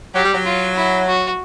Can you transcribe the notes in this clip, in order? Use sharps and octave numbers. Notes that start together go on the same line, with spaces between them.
F#3 G4
G3
F#3
F4
E4
F#4